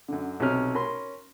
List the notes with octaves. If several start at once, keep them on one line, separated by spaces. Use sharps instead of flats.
F#2 D3
B1 C3 C#4 F6
C#4 A#4 B5 C6